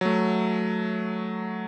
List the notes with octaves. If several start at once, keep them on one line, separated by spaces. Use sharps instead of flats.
F#3 A3